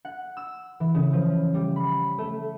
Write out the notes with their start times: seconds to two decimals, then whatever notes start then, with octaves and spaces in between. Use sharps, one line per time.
0.05 F#5
0.37 E6
0.80 E3
0.95 C#3
1.13 F3
1.54 G3
1.76 B5
2.18 A3